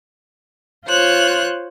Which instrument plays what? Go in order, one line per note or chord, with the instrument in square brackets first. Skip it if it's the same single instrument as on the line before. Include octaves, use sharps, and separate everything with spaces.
[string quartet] F4 C5 C#5 F#6